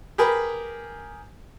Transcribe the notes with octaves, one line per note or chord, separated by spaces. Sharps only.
G4 G#4 A#4 B4